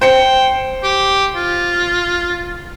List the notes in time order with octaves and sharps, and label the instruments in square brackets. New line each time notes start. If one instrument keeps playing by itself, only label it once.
[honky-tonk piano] C5 C#7 [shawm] G5
[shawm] G4
F4